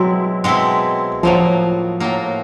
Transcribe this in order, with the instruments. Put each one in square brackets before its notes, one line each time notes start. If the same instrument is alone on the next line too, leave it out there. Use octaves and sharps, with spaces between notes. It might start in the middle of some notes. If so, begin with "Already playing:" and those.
Already playing: [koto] B2 G#3 C4 E4 [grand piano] F#3
[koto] B2 G#3 C4 E4
[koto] A2 F#3 A#3 [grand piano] F3
[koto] A2 F#3 A#3